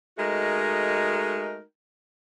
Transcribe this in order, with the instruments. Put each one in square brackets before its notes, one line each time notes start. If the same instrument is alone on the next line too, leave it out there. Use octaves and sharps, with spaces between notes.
[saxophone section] G#3 A3 D#4 F#4 A#4